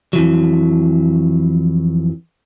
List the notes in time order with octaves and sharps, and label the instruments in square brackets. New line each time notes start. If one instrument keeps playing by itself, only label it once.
[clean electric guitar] F2 E3 F#3